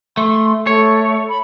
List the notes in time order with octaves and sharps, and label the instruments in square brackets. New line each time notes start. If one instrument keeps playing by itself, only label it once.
[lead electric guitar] A3 [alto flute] C6
[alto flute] A3 [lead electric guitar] C#5
[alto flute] B5